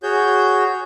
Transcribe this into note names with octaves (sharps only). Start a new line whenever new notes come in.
F#4 G#4 C#5 G6